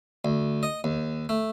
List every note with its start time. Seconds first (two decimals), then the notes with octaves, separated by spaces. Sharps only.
0.25 D2
0.63 D#5
0.84 D#2
1.29 A3